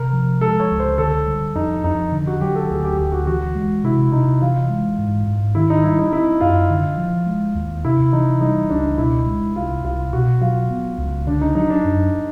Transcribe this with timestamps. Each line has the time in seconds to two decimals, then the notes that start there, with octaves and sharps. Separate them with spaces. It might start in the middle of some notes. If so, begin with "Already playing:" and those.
Already playing: C3 A#4
0.13 F3
0.41 G#3 A4
0.60 C#5
0.70 C#2
0.80 C5
0.98 D3 A4
1.27 G3
1.55 F2 D#4
1.84 F2 D#4
2.12 D3
2.27 F#4
2.41 F#3 G4
2.55 A4
2.70 D2 G#4
2.84 G4
2.98 D2 G4
3.12 F#4
3.27 E3 F#4
3.55 G#3
3.84 C3 E4
4.12 C3 D#4
4.42 E3 F4
4.70 G#3
4.98 G#2
5.27 G#2
5.55 D#3 E4
5.70 D#4
5.84 G3 E4
5.99 D#4
6.13 C4 E4
6.41 F#2 F4
6.70 D3
6.98 F3
7.26 G#3
7.55 D#2
7.85 C3 E4
8.13 E3 D#4
8.41 G3 D#4
8.70 C#2 D4
8.98 B2 E4
9.27 G#3
9.56 C2 F4
9.85 C2 F4
10.13 B2 F#4
10.41 F#3 F4
10.70 B3
10.98 C#2
11.27 D3 D4
11.41 D#4
11.55 F#3 D#4
11.70 D4
11.85 F#2